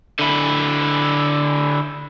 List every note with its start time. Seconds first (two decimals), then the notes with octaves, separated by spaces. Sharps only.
0.19 D3 E4